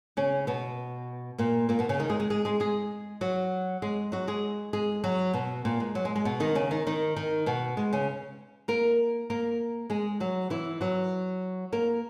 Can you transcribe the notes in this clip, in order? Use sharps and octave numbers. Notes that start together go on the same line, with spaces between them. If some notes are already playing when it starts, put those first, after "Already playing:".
C#3 C#4
B2 B3
A#2 A#3
A#2 A#3
B2 B3
C#3 C#4
D#3 D#4
G#3 G#4
G#3 G#4
G#3 G#4
G#3 G#4
G#3 G#4
F#3 F#4
G#3 G#4
F#3 F#4
G#3 G#4
G#3 G#4
F#3 F#4
B2 B3
A#2 A#3
G#3
F#3
G#3
G#3
B2 B3
D#3 D#4
C#3 C#4
D#3 D#4
D#3 D#4
D#3 D#4
B2 B3
G#3
C#3 C#4
A#3 A#4
A#3 A#4
G#3 G#4
F#3 F#4
E3 E4
F#3 F#4
A#3 A#4